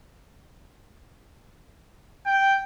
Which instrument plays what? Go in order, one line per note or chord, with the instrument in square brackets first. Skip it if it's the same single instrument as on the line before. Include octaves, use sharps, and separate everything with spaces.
[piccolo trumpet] G5